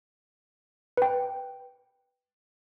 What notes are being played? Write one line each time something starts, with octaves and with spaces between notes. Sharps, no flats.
B4 G5